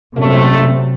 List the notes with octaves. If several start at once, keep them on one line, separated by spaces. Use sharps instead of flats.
A#1 F#2 C3 F#3 A3 C4